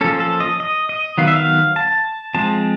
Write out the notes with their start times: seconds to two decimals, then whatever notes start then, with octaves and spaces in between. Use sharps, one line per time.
0.01 F3 A#3 C#4 A4
0.20 A4
0.40 D#5
0.60 D#5
0.89 D#5
1.18 D#3 F#3 B3 F5
1.27 E5
1.36 F5
1.76 A5
2.34 F3 G#3 C4 A5